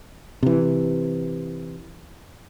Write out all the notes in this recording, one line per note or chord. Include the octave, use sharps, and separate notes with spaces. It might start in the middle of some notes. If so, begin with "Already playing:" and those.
C3 E3